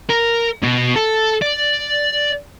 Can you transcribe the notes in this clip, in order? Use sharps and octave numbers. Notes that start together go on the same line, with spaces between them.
A#4
B2
A4
D5